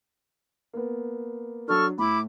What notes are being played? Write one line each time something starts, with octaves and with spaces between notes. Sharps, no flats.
A#3 B3
F#3 D4 A4 C#6 F6
A2 E4 B5 D6